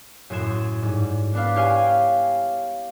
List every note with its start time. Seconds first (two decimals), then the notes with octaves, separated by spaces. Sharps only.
0.30 F#2 A2 C6 G#6 E7
0.82 G#2 G3
1.33 B3 D4 B4 F5
1.56 G4 C#5 F5 G5 G#5